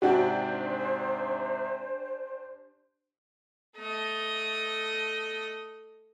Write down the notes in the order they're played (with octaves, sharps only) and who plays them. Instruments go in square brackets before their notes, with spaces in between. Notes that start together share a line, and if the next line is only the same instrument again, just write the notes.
[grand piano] G#2 C3 [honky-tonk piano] C#4 D4 G4 [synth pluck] F#4 F#5 [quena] C5
[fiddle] A3 D#5